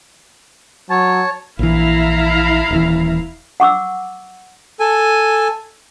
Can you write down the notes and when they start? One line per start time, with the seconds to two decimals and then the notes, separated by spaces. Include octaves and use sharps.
0.90 F#3 C#5 A5
1.59 A#1 E3 E4 F5 A#5
2.71 D#1 E3
3.60 F#5 C#6 D6 E6
4.80 A4 G#5